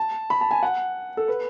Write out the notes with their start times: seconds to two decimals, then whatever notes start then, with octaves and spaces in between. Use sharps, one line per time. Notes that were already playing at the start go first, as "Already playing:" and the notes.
Already playing: A5
0.30 B5
0.41 A5
0.51 G#5
0.63 F#5
1.17 A4
1.28 B4